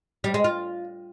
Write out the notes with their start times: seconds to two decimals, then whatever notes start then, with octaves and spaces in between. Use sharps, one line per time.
0.24 G3
0.34 G#3
0.44 F4